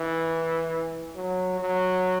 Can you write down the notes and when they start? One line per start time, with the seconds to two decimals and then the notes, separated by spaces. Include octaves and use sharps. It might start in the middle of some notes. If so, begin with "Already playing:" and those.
Already playing: E3
1.16 F#3
1.60 F#3